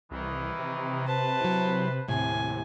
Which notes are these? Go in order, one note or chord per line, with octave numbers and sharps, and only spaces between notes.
C2 D#3 E3
C3
B4 C5 A5
F#3 E4
D#2 A2 C3 G#5